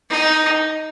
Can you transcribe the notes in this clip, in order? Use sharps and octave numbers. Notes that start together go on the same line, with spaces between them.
D#4